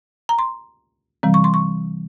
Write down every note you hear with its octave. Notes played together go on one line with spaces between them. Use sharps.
A#5
C6
C3 E3 G3 C4
C#6
C6
C#6